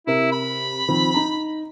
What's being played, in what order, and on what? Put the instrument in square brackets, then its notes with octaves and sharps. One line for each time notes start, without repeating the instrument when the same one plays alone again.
[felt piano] C3 A#4 [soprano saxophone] E4
[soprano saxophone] B5
[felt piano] D#3 F3 C4
D#4 A#5